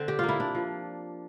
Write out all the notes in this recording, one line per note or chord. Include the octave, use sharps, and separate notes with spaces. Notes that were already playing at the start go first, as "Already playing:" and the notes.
Already playing: D3 C4
G4
A#3 F4
E4
D4
F3